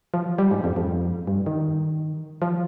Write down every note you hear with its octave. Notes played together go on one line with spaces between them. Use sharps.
F3
G3
G#2
F2
F2
G2
D#3
F3